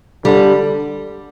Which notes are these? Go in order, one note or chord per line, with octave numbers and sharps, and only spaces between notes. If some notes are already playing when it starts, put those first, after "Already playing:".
D3 G3